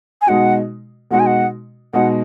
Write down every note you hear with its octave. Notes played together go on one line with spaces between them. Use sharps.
G#5
B2 G#3 D#4 F#4 F#5
B2 G#3 D#4 F#4 F#5
G#5
F#5
B2 G#3 D#4 F#4 F#5